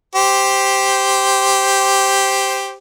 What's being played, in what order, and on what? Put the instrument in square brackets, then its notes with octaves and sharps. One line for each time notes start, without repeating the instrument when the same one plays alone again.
[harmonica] G4 C5